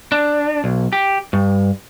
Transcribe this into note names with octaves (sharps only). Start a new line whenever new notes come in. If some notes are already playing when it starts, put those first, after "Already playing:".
D4
B1
G4
G2